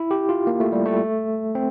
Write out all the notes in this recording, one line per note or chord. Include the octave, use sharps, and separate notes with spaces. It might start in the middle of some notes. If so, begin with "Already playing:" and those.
Already playing: E4
G4
F4
A#3
A3
G3
A3
C4